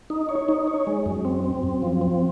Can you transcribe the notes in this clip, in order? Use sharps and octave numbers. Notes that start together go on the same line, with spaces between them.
D#4
C#5
D#4
C#5
G#3
F#2
C4
C4
F#2
F3
C4